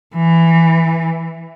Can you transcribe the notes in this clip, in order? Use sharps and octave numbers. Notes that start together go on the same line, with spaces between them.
E3